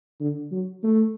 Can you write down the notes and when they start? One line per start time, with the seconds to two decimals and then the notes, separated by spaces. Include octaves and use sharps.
0.20 D3
0.51 F#3
0.83 A3